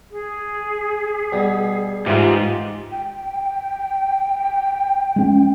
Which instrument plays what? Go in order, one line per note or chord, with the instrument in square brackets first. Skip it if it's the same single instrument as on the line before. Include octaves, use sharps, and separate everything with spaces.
[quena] G#4
[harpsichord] B2 G3
[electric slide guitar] G#2 [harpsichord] E3 [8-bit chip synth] F4 G4
[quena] G5
[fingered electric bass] G#3 C#4